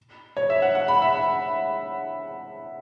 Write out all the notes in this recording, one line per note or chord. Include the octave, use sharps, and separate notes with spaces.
C#5
E5
F#5
F#5
B5
E5
F#5